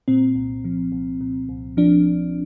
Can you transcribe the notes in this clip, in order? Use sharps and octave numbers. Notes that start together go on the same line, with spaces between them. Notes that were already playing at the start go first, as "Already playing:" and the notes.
A#2 C4
C2
F3
C2
A#2
C2
F3 D4